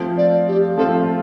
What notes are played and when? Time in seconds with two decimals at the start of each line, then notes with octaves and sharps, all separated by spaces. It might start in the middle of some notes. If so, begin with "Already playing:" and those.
Already playing: F3 A3 C4 F4
0.18 D5
0.48 G4
0.77 F3 A3 C4 F4 A4